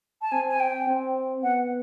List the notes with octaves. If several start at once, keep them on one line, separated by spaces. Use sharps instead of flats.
A5
C4 G#5
G#5
G5
C4
B3 F#5